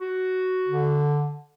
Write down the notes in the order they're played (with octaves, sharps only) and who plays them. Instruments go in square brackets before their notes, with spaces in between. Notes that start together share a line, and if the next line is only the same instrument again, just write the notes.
[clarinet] F#4
[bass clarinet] D3